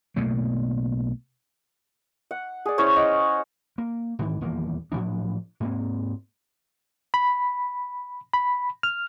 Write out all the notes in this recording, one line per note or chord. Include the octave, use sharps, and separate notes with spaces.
B1 B2 A3 A#3
F#5
G#4 D5
C#4 E4 C5 C#5
D#5 F#5
A#3
G#2 D#3 E3
D#1 E2 F3 A#3
A2 F3 F#3 D4
G#2 A#3 C4
B5
B5
F6